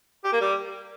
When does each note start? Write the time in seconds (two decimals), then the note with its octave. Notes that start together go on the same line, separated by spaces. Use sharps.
0.24 G4
0.33 A#3
0.41 G3